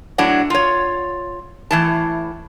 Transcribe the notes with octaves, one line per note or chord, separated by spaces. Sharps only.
A2 F#3 D4 F#5
F4 C#5
A2 E3 A5